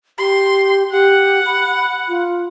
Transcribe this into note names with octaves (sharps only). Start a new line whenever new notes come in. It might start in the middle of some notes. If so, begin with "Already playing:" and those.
G4 C6
G4 F#5
B5
F4